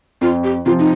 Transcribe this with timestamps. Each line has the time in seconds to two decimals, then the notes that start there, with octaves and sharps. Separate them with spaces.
0.21 F2 F4
0.44 G4
0.66 C3 F3 F4
0.79 D#4